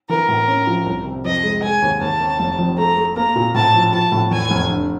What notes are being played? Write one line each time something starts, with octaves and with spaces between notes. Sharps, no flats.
E3 A#4
A2
C#4
F3
C2
C3
F2 D#5
G#3
G#3 G#5
D#2
D#2 A5
D#3
F1
F2
A3 A#5
A3
A#3 A#5
A#2
A2 A5
F3
F3 A5
A2
E2 G#5
F1
D3